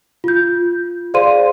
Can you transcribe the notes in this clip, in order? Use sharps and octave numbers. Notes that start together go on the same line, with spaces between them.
F4 G6
G#4 C5 D5 F5 C6 D#7